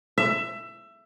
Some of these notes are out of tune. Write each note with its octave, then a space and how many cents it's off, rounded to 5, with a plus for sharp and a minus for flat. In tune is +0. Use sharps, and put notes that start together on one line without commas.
E5 +20